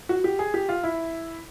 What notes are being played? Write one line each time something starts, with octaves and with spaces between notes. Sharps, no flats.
F#4
G4
G#4
G4
F4
E4